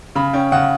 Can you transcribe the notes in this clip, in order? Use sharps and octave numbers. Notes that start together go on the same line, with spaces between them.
C#3 B5
C#4 G5
C#3 F#5